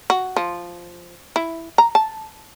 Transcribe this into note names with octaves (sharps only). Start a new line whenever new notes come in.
F#4
F3
E4
A#5
A5